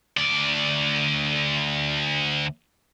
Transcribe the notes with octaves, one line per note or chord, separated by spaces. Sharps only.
D2 D5